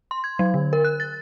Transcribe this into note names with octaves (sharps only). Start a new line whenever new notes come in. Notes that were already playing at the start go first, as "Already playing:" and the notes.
C6
G#6
F#3
D3
A#4
F#6
A6